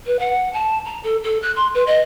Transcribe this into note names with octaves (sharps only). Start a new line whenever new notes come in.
B4
F#5
A5
A#5
A4
A4
F#6
C6
B4
D#5